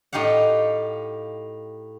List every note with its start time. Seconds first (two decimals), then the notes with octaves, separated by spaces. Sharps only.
0.13 A2 D#4 G4 F5 F#5